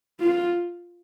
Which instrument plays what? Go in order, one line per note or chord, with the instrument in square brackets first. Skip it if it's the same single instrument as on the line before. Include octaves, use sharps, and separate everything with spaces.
[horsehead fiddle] F4